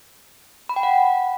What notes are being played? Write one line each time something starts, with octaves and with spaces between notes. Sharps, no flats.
B5
G5
F#5